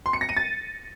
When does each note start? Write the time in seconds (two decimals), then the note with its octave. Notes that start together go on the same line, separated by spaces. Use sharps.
0.06 C6
0.13 C#7
0.21 A#6
0.29 D#7
0.37 A6